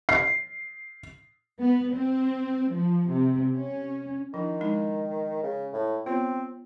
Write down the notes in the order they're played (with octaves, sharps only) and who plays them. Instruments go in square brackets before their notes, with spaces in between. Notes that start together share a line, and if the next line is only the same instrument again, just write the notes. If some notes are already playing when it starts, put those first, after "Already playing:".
[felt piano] C7
[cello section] B3
C4
F3
C3
C#4
[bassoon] D#3 [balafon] F3 D4 E4
[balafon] F3 G#3 D#4
[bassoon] C#3
A2
[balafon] B3 F4 C#5 [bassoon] C4